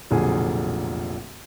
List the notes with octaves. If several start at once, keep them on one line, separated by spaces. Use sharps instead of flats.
F1 B1 A#2 D3 F3 G#4